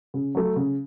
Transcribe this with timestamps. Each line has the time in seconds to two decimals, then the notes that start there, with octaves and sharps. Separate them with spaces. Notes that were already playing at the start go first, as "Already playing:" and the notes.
0.14 C#3
0.35 F#3 A3
0.56 C#3